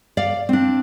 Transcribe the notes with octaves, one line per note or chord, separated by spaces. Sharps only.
D5 F5
C4 D4